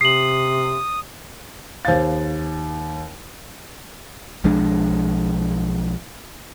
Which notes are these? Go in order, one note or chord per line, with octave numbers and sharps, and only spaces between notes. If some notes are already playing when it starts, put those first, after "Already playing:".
C3 D#6 C7 F#7
D#2 C5 F5 A6
B1 F3 G#3 D4